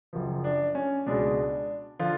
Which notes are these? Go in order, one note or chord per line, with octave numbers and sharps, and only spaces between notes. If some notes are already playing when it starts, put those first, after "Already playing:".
F#1 F#2 F3
D4
C#4
C#2 B2 G#3 D4
D3 F3 F4